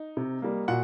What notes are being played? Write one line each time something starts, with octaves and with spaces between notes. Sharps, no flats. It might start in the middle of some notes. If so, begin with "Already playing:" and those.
Already playing: D#4
C3
G3 A#3
A#2 F#4 F#5